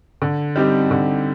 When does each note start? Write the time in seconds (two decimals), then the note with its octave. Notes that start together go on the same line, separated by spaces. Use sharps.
0.22 D3
0.56 G3 C4 D#4 G4
0.91 D3